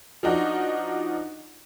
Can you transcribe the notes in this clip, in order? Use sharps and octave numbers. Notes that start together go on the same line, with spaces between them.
F3 D4 D#4 F#4